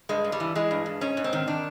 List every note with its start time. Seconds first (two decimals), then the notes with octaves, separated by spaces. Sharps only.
0.09 G2 G#3
0.24 G2
0.32 G3
0.40 E3
0.55 E3 G#3
0.71 G2
0.86 G2
1.01 G#2 C#4
1.17 G#2
1.24 C4
1.33 D#3
1.48 D#3 D4